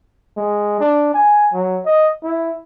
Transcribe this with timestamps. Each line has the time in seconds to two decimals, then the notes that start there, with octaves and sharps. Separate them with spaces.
0.37 G#3
0.80 D4
1.14 G#5
1.53 F#3
1.86 D#5
2.23 E4